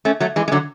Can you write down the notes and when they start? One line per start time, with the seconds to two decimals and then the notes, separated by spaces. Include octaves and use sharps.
0.05 A3 C#4
0.20 F#3 A3
0.36 E3 G#3
0.48 G#3
0.52 D3 F#3